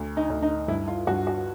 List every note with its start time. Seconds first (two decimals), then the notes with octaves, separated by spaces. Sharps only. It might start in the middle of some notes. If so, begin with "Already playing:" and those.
Already playing: D2
0.17 D#4
0.30 D2
0.42 D#4
0.68 G2 E4
0.88 F4
1.07 G2 F#4
1.27 F#4